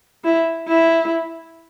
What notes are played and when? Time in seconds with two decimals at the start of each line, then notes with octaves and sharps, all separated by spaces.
0.24 E4
0.68 E4